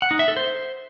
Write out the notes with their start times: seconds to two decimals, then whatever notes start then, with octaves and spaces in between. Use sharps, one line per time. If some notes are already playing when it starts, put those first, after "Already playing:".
0.02 F#5
0.11 D#4
0.19 E5
0.28 A4
0.36 C5